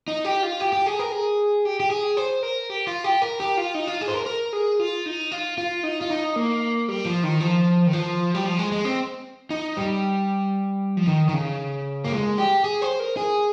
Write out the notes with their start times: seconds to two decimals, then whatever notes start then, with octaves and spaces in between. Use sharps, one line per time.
0.08 D#4
0.25 G4
0.43 F4
0.60 G4
0.73 G4
0.86 G#4
0.99 A#4
1.12 G#4
1.65 G4
1.80 G4
1.91 G#4
2.17 C5
2.43 A#4
2.70 G4
2.87 F4
3.04 G4
3.22 A#4
3.40 G4
3.57 F4
3.75 D#4
3.87 F4
4.01 G#4
4.08 C5
4.14 A#4
4.26 A#4
4.53 G#4
4.80 F4
5.06 D#4
5.32 F4
5.58 F4
5.83 D#4
6.01 F4
6.10 D#4
6.36 A#3
6.88 G3
7.05 F3
7.23 D#3
7.40 F3
7.87 D#3
7.93 F3
8.35 G3
8.46 F3
8.59 G#3
8.72 G#3
8.85 C4
9.50 D#4
9.77 G3
10.97 F3
11.07 D#3
11.29 D#3
11.33 C#3
12.04 A#3
12.12 G#3
12.38 G4
12.64 G#4
12.82 C5
13.00 A#4
13.17 G#4